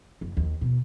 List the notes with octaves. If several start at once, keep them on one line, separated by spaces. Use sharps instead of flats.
F#1
D#2
B2